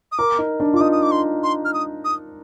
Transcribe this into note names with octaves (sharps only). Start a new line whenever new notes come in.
D#6
A#4 D6
D#4
D4
F4 D6
D#4 D#6
D#6
D6
C6
C6
F6
D#6
D#6